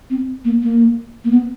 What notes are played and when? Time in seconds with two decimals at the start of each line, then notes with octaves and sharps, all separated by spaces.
0.10 C4
0.45 A#3
0.62 A#3
1.24 A#3
1.31 B3